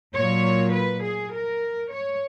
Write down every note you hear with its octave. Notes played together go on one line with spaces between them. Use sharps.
A#2 F#3 C#5
B4
G#4
A#4
C#5